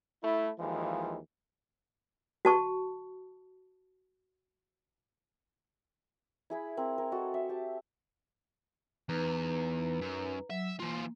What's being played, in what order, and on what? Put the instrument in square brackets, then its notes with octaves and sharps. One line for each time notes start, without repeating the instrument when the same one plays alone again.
[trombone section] A3 E4
D#2 E3 F3 G#3
[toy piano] F#4 A5 C#6
[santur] E4 G#4 B5
C4 A#4
A#4
F#4 A4 D#5
E5
G4 A5
[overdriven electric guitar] E2 [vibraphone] D#4 B4 A#5
[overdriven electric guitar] F#2
[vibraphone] F#3 [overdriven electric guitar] E5
[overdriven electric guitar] E3 F4 [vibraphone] A#3